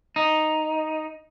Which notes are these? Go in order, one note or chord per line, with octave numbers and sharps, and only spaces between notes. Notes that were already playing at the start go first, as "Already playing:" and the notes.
D#4